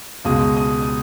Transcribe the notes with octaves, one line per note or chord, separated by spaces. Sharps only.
C#2 B2 G#3 D#6
D#6
D#6